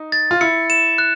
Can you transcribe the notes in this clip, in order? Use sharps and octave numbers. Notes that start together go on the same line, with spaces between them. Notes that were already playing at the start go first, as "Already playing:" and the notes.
Already playing: D#4
A6
F4
E4 C#7
E7
F#6